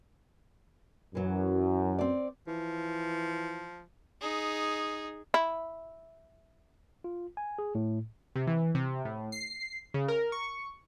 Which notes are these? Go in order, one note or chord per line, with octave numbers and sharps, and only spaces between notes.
F#2 E3 F#3
C4 D5
E3 F3
D#4 G#4
E4
F4
G#5
G#4
A2
C3
E3
C3
A2
C7
C#3
A#4
C#6